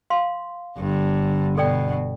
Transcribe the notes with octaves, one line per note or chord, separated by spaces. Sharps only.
F5 C6
G1 G2 D3
B2 A4 D5 G5